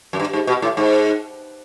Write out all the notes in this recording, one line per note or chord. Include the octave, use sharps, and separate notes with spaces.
F#2
G2
G#2
B2
A2
G#2